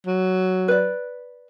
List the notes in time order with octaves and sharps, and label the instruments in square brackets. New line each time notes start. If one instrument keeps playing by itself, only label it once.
[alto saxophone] F#3
[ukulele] B4 D5